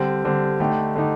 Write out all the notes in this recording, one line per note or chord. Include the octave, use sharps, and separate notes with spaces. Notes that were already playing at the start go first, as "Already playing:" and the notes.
Already playing: D3 G3 C4
D3 G3 C4
D3 A3 D#4 G4
D3 A3 D#4 G4